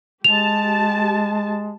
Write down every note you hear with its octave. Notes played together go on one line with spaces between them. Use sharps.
G#3 G4 A5 F7